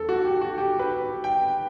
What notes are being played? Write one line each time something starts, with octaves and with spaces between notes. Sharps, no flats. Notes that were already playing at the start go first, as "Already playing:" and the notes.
Already playing: E2 A4
F#4
G4
F#4
G4
B4
G5